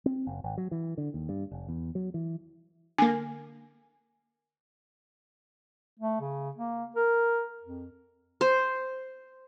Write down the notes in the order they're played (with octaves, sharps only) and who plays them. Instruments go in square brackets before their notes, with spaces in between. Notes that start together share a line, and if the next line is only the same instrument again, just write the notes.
[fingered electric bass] C4
F#1
G#1
F#3
E3
D3
D#2
G2
F1
E2
F#3
E3
[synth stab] D3 A#3 [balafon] G#5
[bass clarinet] A3
C#3
A#3
A#4
F2
[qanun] C5